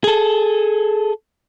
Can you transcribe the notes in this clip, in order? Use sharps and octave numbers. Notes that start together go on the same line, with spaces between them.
G#4 A4